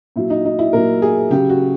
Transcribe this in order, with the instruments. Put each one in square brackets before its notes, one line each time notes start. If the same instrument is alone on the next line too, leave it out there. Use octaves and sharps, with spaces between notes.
[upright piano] A#2 F#3 E4
D#4
D#4
E4
A#2 F#3 A#4
G#4
C#3 F#3 G4
F#4